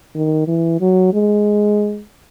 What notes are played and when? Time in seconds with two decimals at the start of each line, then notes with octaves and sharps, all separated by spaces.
0.15 D#3
0.48 E3
0.81 F#3
1.14 G#3